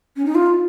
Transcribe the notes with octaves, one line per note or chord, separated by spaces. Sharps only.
C#4
D#4
F4